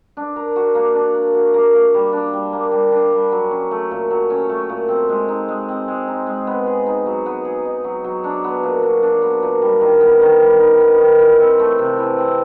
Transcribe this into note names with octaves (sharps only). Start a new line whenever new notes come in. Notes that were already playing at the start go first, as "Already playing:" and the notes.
D4
A#4
F#4
A#3
D4
A#4
F#4
A#3
A#3
G3
D4
G3
A#3
G3
D4
G3
F#3
C#4
A3
A#2
F#3
C#4
A3
A#2
C4
G#3
D#4
G#3
C4
G#3
D#4
G#3
B3
G#4
D#4
F#3
B3
G#4
D#4
F#3
F#3
D4
B3
A#2
F#3
D4
B3
A#2
G3
D#3
B3
D#3
G3
D#3
B3
D#3
E3
C4
A3
C3
E3
C4